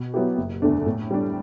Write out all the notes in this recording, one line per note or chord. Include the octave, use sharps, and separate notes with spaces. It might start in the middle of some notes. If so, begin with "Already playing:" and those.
Already playing: B2
F#3 B3 E4 G4
F#1
E2 D3 A3 D4
A2
G3 D4